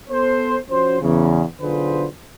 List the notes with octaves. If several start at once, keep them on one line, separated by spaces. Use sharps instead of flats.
B3 A4 C5
F3 C#4 F#4 C5
E2 C#3
B1 D3 F4 G#4 B4 C5